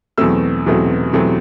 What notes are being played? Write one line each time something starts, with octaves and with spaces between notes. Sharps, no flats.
E2 B2 F#3 A3 C4 E6
E2 B2 F#3 A3 C4
E2 B2 F#3 A3 C4